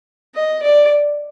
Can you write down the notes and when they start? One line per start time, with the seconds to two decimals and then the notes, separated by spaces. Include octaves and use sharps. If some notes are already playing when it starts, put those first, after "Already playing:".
0.35 D#5
0.62 D5